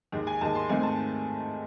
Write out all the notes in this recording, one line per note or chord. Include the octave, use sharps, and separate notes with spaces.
D#2 D#3 G#3
G#5
D#2 D#3 G#3 A5
C6
G#2 D#3 A3 C4 G#5
A5